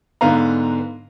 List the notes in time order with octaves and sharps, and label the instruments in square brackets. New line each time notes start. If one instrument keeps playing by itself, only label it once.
[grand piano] G#2 D3 B3 F5 A#5